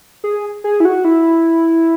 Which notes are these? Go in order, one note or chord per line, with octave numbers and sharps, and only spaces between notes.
G#4
G#4
E4
F#4
E4